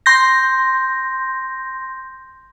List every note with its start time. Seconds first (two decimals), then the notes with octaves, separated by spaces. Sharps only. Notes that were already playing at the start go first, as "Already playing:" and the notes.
0.06 C6 G6 A#6